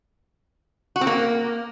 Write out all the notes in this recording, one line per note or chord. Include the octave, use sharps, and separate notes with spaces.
F#4
C4
A#3